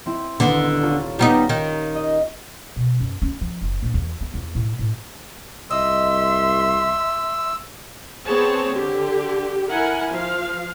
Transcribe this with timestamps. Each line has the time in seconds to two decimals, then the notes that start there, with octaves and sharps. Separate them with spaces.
0.06 C4 E4
0.40 D#1 D3 B3
0.83 F4 A4 C#5
1.19 G3 B3 D#4 F4 A#5 D#6
1.49 D#3
1.95 D#5
2.76 B2
3.00 F#2
3.22 C#4
3.41 F3
3.61 F#1
3.82 A#1
3.94 E2
4.20 B3
4.34 E2
4.55 A2
4.79 A2
5.71 C2 D#5 E5 C6 E6
8.26 B3 C4 G#4 C#5 A5
8.72 D3 G4
9.70 E4 A#4 F#5 G#5
10.10 F3 F5